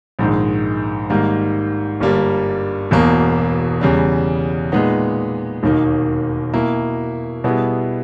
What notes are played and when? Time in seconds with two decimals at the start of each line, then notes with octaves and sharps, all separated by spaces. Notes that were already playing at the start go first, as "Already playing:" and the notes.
0.19 A#1 G#2 D#3 G#3
1.10 G#2 D#3 G3 A#3
2.00 G1 G2 G3 A#3
2.91 E1 E2 B2 A#3
3.81 E2 C#3 G3
4.72 A#2 G#3 B3 D#4
5.63 E1 D#2 D#3 A#3 D#4
6.53 B2 A#3 E4
7.44 B2 G3 B3 E4 G#4